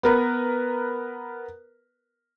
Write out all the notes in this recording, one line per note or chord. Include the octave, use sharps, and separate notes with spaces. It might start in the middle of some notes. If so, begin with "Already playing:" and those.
B3 A#4 B4